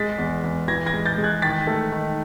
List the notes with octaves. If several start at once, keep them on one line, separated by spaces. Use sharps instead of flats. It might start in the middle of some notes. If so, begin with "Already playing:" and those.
Already playing: G#3 A6 B6
E2
E2
E3 G#6 A#6
G#6 A#6
G#3
G6 A6
G#3
F#6 G#6
D#3 A6 B6
A3
D#3